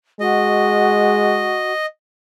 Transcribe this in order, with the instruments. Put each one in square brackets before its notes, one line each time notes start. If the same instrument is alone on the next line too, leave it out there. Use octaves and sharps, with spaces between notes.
[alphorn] G#3 [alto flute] F#4 [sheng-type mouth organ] D#5